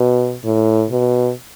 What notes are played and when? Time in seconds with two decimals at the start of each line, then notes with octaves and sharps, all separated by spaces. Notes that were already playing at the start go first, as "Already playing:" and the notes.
Already playing: B2
0.44 A2
0.90 B2